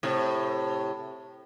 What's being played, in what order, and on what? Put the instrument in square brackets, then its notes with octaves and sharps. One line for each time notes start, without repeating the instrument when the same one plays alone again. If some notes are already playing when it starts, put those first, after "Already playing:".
[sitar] A2 C3